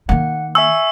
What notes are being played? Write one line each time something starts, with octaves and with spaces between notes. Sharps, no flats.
D#3 A#3 F#5
E5 G#5 C#6 E6